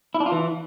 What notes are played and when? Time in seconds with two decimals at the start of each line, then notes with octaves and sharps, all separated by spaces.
0.15 E4
0.20 D4
0.26 F4
0.32 E3